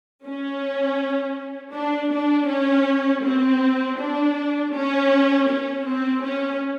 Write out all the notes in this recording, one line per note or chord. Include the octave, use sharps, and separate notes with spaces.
C#4
D4
D4
C#4
C4
D4
C#4
C#4
C4
C#4